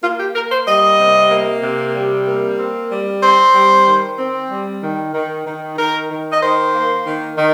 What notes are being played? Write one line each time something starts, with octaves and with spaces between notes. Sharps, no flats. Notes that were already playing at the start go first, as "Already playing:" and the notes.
A#3 F4
G4
A#3 A#4
C5
G3 D#5
C3
A#3
C3
G3
A#3
C4
G3
C4 C5
G3
D#3
C4
G3
D#3
D#3
D#3
D#3 A#4
D#3
D#5
D#3 C5
A#3
D#3
D#3